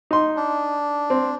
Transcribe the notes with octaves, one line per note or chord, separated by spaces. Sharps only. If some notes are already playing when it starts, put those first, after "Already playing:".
D#4 C6
D4
C4